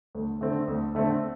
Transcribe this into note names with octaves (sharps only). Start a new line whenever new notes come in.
D2
D3 A3 C4
D2
D3 A3 C4